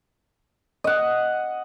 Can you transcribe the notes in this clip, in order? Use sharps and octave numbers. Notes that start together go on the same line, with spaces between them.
D#5 F#5